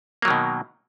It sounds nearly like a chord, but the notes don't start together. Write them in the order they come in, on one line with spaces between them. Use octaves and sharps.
A#3 F#3 D#3 B2